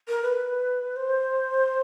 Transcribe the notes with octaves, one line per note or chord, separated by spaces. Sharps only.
A#4
B4
C5